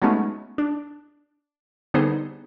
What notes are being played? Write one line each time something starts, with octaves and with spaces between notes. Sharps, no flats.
F#3 G#3 A3 B3 C#4 D#4
D4
D3 G3 B3 D#4 G#4 C5